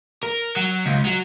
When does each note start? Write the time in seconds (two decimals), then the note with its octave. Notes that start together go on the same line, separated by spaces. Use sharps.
0.23 A#4
0.56 F#3
0.86 C#2
1.06 F#3